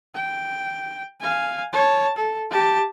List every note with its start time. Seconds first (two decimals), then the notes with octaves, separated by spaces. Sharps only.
0.15 G5
1.21 F5 G#5
1.73 C#5 A5
2.16 A4
2.50 G4 A5